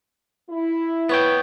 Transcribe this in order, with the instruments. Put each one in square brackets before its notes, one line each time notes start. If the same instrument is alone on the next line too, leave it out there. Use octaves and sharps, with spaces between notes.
[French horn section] E4
[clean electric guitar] B3 C#5 G5 [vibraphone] B4